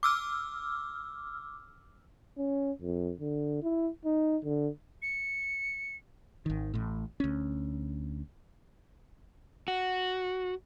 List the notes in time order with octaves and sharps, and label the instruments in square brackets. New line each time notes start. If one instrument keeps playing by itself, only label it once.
[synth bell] D6 E6 F6
[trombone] C#4
F2
D3
E4
D#4
D3
[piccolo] C#7
[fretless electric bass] G#1 D#3
A1 A2
D2 C#4
[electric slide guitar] F#4